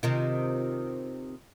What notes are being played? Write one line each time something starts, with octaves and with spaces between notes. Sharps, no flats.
C3 D#3 F4